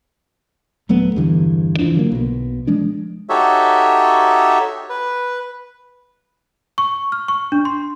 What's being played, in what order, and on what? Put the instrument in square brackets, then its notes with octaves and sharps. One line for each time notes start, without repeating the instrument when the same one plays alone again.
[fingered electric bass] D#1 F#3 A3 B3
E2 G2 D3 E3
F1 E3 F3 D4
D3 F#3 A#3
B1 B2
F3 G#3 D4
[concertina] D#4 F#4 G4 A4 C#5 E5
B4
[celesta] C#6
F6
C#6
D4
C6